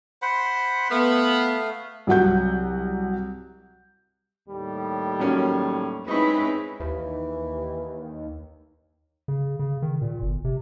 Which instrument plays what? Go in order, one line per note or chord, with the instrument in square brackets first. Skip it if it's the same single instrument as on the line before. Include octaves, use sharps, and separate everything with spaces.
[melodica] C5 F#5 B5
[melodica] A3 F5 [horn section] B3
[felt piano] C2 F#3 F#5 G6
[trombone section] D#2 A2 G3
[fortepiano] F#3 A#3 C#4
[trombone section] G#3 C#4 G#4 [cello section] C4 E4 B4 [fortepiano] D#4 C#6
[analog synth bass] D#2 [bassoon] E3
[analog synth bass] C#3
C#3
D#3
A#2
G1
C3